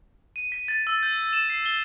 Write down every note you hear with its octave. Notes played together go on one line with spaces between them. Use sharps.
D#7
B6
A6
E6
G6
E7
C7
G7